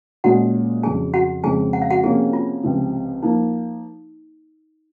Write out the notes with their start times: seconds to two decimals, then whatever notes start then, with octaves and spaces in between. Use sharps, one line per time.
0.24 A#2 G#3 C#4 F#4 F#5
0.83 F2 C#3 F#3 G#4 G#5
1.14 F#4 F#5
1.44 F2 C#3 G#3 C4 G#4 G#5
1.73 F#5
1.82 F5
1.90 F#4 F#5
2.03 C3 F3 A#3 C#4 G#4
2.33 F4
2.63 C#2 C3 F3
3.23 F3 A#3 D#4